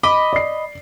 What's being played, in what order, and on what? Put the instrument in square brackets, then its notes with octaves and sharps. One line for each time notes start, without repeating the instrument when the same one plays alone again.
[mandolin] D#5 B5 [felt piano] D6
[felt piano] D5 C7